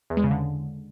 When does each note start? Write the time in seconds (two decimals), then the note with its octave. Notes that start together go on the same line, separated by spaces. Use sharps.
0.10 E2
0.17 G#3
0.24 C#3
0.31 D3